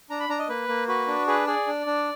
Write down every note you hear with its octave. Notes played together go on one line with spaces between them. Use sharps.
D4 A#5
B5
D4 A#5
D#5
A#3 B4
A#3
F#4 B4
D4
G#4 B4
G#4 D5
D4
D4